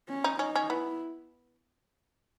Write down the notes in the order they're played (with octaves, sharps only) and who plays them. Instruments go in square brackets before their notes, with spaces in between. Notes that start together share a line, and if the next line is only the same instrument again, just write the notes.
[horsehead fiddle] C#4
[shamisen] D#4
[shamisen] C#4 [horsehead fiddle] D#4
[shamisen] C#4
[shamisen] B3 [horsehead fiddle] E4